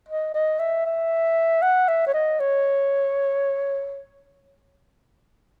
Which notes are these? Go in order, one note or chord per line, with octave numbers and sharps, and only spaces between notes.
D#5
D#5
E5
E5
F#5
E5
C#5
D#5
C#5